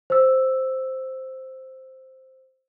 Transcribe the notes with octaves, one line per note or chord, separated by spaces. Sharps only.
C5 E6